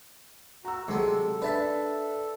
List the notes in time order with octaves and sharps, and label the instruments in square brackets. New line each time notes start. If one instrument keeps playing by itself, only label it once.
[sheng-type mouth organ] F#4 [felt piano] A#5 E6
[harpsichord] C3 G#3 [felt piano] F#3 [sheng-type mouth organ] A4
[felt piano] D4 E5 B6 [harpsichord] B4 A5